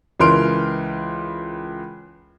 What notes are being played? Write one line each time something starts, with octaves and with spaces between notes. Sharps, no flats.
C#2 E3 A#4 C6 F6 D7